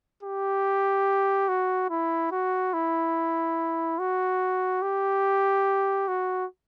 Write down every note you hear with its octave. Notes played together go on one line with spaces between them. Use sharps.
G4
F#4
E4
F#4
E4
F#4
G4
F#4